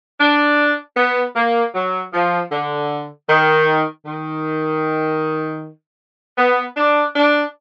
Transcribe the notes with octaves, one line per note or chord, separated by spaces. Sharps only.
D4
B3
A#3
F#3
F3
D3
D#3
D#3
B3
D4
D4